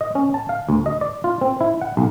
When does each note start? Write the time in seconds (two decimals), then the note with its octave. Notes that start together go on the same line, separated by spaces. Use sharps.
0.01 D#5
0.15 C#4
0.34 A5
0.49 F5
0.69 D2
0.86 D#5
1.01 D5
1.24 F4
1.41 C4
1.61 E4
1.81 F#5
1.97 B1